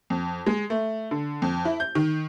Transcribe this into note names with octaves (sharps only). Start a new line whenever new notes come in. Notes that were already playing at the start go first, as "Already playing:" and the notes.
F2
G#3
A3
D3
F2
E4
G6
D#3